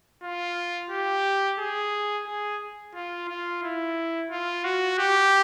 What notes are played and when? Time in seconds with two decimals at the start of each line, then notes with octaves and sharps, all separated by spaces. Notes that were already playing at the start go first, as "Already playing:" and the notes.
0.23 F4
0.91 G4
1.59 G#4
2.26 G#4
2.94 F4
3.28 F4
3.63 E4
4.30 F4
4.64 F#4
4.98 G4